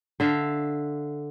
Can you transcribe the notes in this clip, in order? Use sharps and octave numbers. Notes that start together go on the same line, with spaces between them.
D3 E5 F5